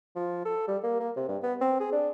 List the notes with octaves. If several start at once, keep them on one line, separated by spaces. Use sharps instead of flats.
F3
A4
G3
A#3
A#3
C3
G2
B3
C4
G#4
D4